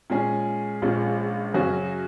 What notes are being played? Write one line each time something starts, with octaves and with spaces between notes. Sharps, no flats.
A#2 G#3 C#4 G#4
A#1 A#2 G#3 C#4
F#2 C#3 F#3 C#4 F#4